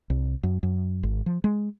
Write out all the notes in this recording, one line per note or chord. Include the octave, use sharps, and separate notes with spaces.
C2
F#2
F#2
G#1
F3
G#3